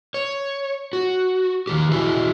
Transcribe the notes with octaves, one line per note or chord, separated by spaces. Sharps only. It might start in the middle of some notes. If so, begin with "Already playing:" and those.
C#5
F#4
D#3 E3 G4
E4 F#4 G#4 D#5